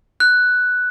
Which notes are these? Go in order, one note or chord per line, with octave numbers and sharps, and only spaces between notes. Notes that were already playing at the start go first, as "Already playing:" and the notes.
F#6